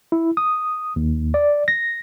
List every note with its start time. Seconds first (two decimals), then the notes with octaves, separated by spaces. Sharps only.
0.12 E4
0.37 D#6
0.96 D#2
1.34 D5
1.68 A#6